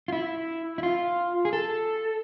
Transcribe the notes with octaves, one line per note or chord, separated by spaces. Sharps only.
F4
E4
E4
F4
G#4
A4